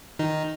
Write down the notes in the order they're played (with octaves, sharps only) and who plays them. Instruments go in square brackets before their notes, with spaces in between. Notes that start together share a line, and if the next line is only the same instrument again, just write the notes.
[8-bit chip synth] D#3 D#4